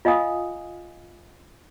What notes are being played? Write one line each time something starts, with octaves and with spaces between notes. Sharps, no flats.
F4 D#5 F5 G#5 D#6